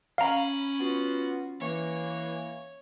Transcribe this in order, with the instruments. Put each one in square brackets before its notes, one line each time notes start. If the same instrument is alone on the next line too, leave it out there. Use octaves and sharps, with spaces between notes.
[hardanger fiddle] C#4 B5 [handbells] F5 A#5
[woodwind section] B3 F4 F#4
[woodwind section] E3 A#3 [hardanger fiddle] C#5